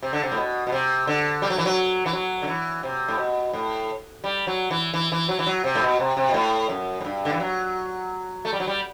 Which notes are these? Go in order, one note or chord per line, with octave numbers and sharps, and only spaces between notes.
C3
D3
C3
A2
B2
B2
C3
D3
G3
F#3
E3
F#3
E3
F#3
D3
E3
C3
A2
B2
A2
G3
F#3
E3
E3
E3
F#3
E3
F#3
C3
A2
B2
C3
C3
B2
A2
F#2
A2
G2
D3
E3
F#3
A3
G3
F#3
G3